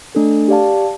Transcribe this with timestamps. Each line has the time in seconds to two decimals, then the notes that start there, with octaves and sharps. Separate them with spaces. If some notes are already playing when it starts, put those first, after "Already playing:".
0.15 A3 D4 A4
0.48 G4 D5 F5 A5